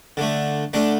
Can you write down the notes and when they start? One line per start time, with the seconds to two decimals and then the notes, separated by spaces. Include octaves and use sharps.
0.17 D3 A3
0.73 D3 A3 D4